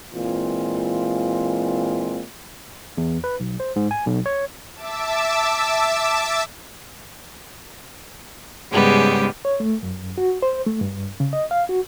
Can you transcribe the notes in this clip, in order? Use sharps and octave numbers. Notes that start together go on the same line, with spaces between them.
A#2 E3 G#3 C4 F4
E2
B4
B1
C5
G#2
G#5
B1
C#5
E5 A5 D6 E6
G#2 C#3 G3 G#3 B3 G4
C#5
A3
F#2
F#4
C5
A3
G2
C#3
D#5
F5
F#4